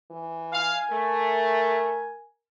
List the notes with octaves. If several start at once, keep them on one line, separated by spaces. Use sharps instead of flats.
E3
F5 G#5
A3 A#4